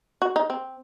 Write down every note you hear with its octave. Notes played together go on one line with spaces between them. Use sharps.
F#4
D#4
C4